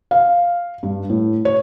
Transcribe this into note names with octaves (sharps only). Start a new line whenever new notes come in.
F5
G2
A2
C#5